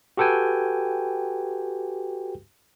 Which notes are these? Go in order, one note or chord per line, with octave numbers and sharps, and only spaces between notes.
F#4 G4 A4 B4 G5 G#5